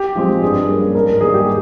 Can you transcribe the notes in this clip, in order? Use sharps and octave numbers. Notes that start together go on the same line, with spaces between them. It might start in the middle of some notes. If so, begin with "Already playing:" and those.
Already playing: G4
F3 G#3 C4
G2 G#4
G3 A#3 C#4
G#2 A#4
A#4
D#3 G3 A#3 G#4
G4